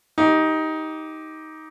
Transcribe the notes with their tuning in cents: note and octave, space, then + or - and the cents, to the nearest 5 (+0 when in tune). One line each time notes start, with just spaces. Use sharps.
D#4 +15 G4 +0